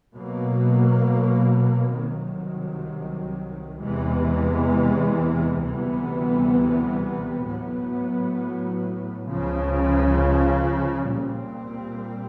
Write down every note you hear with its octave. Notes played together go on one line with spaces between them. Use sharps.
B2 F#3 A#3
C2 C3 D#3 F#3
E2 C3 E3 G#3
D2 C3 E3 G3 B3
A2 F#3 B3
C#2 C#3 F3
A#2 G3 C4